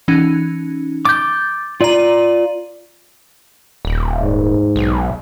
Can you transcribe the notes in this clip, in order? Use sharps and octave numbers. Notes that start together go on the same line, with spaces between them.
E3 C#4 D#4
D6 G6 A6
F4 D5 A#5 D#7 F#7
D#1
G#2
B1